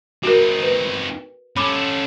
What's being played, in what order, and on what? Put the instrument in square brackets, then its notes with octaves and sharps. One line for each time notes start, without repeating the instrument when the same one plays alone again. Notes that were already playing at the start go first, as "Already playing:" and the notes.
[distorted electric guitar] C4 D#4 [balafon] F#4 A#4
[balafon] B4
[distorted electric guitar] C#4 A4 [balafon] B5 D6